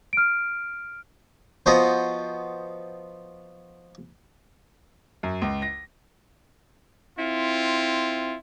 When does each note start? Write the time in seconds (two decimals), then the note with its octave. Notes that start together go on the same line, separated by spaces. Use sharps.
0.13 F6 D7
1.66 F3 B3 F#4 C5 D#5
5.23 F#2
5.42 C#2
5.62 A#6
7.18 C4 E4 F4